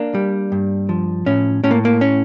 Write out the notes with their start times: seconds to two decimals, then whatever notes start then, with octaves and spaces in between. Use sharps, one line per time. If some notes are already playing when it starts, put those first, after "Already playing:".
Already playing: A#3 D4
0.15 G3
0.52 G2
0.89 F3
1.26 A2 C#4
1.64 A2 C#4
1.71 A#3
1.85 A#3
2.01 C#4